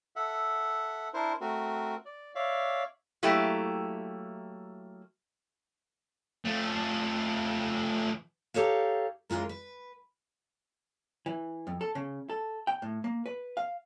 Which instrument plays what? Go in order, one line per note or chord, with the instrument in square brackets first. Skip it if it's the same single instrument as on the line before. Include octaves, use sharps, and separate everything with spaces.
[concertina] A4 E5 F#5
D4 E4 A#4 C5
A3 C4 F#4 A#4
D5
C#5 D5 E5 F5
[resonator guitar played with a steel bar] F#3 A3 A#3 E4 G4
[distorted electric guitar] F3 A3
[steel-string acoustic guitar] D#4 G4 A4 C#5 F5
F#2 E3 G#3 F4 A#4
B4
[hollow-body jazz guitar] E3
F2
A4
C#3
A4
G5
A2
A#3
B4
F5